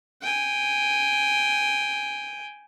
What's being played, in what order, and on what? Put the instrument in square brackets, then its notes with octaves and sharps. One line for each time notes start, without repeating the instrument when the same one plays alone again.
[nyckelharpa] G5 G#5